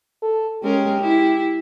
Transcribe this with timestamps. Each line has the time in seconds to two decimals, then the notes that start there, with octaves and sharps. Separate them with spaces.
0.23 A4
0.63 G#3 C#4 G4 A#4
1.00 E4